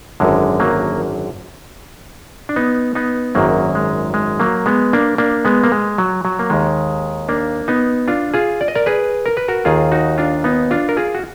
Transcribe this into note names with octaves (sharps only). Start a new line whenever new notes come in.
G#1 F#2 D3 G#3
F#3 A#3
D4
B3 D#4
B3 D#4
G#1 F#2 D#3 F#3 A#3
G#3
G#3
F#3 A#3
G#3 B3
A#3 D4
A#3 D4
G#3 B3
A#3
G#3
F#3
F#3
A#3
D#2 D#3 G#3
A#3 D4
B3 D#4
D4 F4
F4 G#4
D5
D#5
A#4 D5
G#4 B4
A#4
B4
F#4 A#4
D#2 D#3 F4 G#4
D#4 F#4
D4 F4
B3 D#4
D4 F4
A#4
F4 G#4
F#4